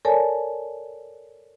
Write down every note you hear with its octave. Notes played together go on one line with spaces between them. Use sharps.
A4 A#4 C#5 D5 G#5 A5